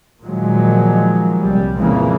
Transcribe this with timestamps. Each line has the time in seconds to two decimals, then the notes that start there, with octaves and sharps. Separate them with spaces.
0.22 A#2 D#3 F3 F#3 G#3
1.41 C2 G3
1.77 F2 A#2 C#3 E3 G#3 A#3